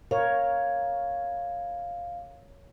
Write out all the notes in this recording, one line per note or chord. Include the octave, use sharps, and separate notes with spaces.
A#4 C#5 F5